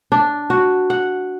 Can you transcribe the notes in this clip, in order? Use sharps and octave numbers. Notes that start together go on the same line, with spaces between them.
D4
F#4
F#5